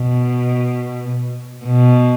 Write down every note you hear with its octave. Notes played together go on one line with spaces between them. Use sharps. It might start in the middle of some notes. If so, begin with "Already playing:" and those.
Already playing: B2
B2